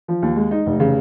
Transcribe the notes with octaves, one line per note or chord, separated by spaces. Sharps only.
F3
D#2
G#3
D#4
F1
C#3